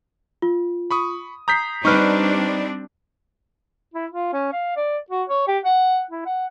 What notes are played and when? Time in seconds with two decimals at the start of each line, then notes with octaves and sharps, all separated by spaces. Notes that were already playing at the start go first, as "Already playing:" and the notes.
0.42 F4
0.91 B5 C#6 D#6
1.48 A#5 D#6 G6 B6 C7
1.85 G3 C4 D4 D#4 B4 C#6 F6 F#6
3.94 E4
4.11 F4
4.33 C#4
4.53 F5
4.76 D5
5.10 F#4
5.29 C#5
5.47 G4
5.65 F#5
6.11 E4
6.26 F#5